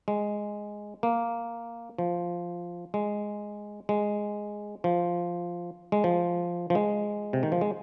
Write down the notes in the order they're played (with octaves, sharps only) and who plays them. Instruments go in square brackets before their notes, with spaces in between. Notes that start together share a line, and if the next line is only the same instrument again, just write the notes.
[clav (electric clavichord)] G#3
A#3
F3
G#3
G#3
F3
G#3
F3
F3
G#3
C3
D#3
F3
G#3